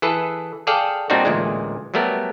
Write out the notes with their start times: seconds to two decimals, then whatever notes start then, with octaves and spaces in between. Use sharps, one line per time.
0.02 E3 G#4 A4 B4
0.67 G#4 A4 D5 F5 G5
1.10 A#2 G3 C4 D4 D#4 F#4
1.25 A1 D2 A#2 G#3
1.94 F#3 G3 A3 B3 A#4